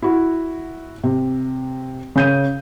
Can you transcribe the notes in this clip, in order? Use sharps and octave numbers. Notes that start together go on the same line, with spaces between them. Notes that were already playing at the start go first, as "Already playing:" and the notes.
E4 F#4
C3
C#3 G6 D#7